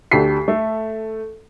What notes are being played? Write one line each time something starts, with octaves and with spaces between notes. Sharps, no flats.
D2 D3 G4 A4 B6 C7
A3 A4